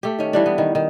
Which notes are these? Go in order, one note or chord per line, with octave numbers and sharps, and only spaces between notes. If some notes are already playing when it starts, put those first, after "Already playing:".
A3 G4
D#3 C#4
E3 G3 D4
B3
D#3
D#3